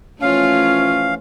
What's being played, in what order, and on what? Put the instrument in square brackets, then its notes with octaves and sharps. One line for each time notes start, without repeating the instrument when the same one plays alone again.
[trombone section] E3 F3 C#4 [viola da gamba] A3 F4 [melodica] F5